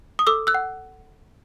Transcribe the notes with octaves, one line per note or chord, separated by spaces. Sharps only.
D#6
A4 D6 E6
E6 F#6
F#5